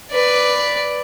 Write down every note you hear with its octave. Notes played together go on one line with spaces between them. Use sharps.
B4 D5